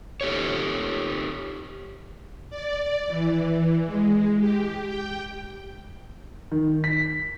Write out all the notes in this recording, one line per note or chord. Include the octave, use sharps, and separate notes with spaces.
D#4 G4 A4 C#5
D5
E3
G#3
G4
G5
D#3
B6